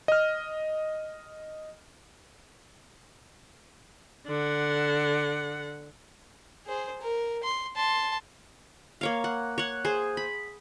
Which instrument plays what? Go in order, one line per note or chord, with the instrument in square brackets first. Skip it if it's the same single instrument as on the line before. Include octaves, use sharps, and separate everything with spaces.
[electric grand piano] D#5 F6
[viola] D3 F#5
[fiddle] G#4 C5
A#4
C6
A5 C6
[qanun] A#3 C#5 F5
F#5
C#5 F#5
G#4 C5
B5